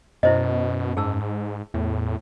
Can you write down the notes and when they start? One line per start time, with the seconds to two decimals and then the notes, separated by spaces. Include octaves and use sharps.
0.23 F#2 B2 E4 C5 D#5
0.97 G#2 G#4 A5 E6
1.74 E2 A2